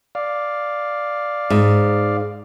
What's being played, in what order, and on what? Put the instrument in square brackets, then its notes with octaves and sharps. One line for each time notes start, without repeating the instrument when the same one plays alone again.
[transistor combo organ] D5 F5
[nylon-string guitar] G#2